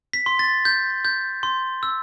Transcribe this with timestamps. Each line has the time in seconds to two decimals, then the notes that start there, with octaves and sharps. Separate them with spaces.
0.13 B6
0.26 C6
0.39 A6
0.65 G6
1.05 G6
1.43 C6
1.83 E6